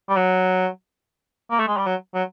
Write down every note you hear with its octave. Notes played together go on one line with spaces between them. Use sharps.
G3
F#3
A#3
A3
G#3
G3
F#3
F#3